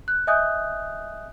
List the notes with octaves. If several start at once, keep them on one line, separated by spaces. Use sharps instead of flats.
F#6
D#5 E5 G#5 D#6 F#6 G6